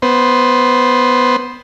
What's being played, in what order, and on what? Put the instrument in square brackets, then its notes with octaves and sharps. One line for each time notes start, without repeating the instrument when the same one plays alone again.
[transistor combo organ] B3 C5